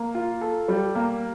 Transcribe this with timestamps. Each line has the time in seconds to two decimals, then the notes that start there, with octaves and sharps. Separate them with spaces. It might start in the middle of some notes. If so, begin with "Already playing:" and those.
Already playing: A#3
0.15 F4
0.41 A4
0.68 G3
0.95 A#3